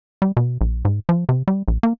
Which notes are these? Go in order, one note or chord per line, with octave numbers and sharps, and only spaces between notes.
G3
B2
A#1
G#2
F3
C3
G3
A#1
A#3